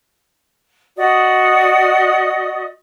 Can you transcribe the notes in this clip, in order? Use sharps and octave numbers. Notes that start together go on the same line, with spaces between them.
F#4 D5 D#5 D#6